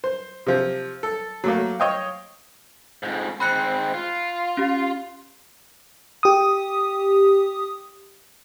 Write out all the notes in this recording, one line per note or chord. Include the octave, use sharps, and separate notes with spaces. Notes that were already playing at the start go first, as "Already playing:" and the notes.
C5
C3 F3
A4
F#3 A3 A#3
C#5 D#5 F5 G5
F2 G#2
G#2 C4 B5 F#6 C#7
F4
C#4 G4
G4 D#6